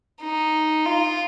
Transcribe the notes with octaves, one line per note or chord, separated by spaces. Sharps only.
D#4
F4